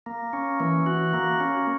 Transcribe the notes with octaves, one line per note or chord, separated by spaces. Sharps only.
A#3
C#4
E3
F#4
A#3
C#4